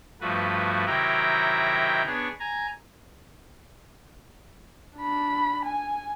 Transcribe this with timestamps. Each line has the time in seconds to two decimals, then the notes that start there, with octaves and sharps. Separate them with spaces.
0.21 G2 F3 A3 F#4 B4
0.86 C3 D#3 F#3 E4 G5 A#5
2.06 B3 D4 G#4 C#5
2.40 G#5 A#5
4.97 D4 B5
5.65 G#5